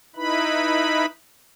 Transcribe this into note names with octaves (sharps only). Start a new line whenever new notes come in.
D#4 E4 B4 B5